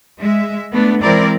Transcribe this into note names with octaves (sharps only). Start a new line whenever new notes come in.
G#3 E5
A3 B3 D4
E3 G#3 C4 E4 A#4 D5